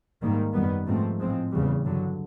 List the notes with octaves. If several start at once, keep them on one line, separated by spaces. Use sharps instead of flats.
G#2 D#3 G3 A#3
F#2 D#3 G3 B3
G#2 F3 A3 C4
A2 F3 G#3 C4
E2 C#3 E3 G3
G2 D3 F#3